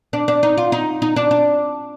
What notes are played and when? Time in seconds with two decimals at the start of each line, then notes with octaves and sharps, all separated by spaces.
0.13 D4
0.28 D4
0.43 D#4
0.58 F4
0.72 D#4
1.02 D#4
1.16 D4
1.31 D4